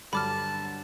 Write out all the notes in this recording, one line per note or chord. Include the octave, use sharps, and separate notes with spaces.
G2 D3 F#3 A5 B5 D6 F6